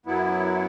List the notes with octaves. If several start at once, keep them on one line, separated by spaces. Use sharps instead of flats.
F#2 F#3 B3 E4